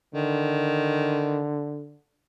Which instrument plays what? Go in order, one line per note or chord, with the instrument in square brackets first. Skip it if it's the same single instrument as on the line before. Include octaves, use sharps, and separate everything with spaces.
[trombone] D3 [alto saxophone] D#3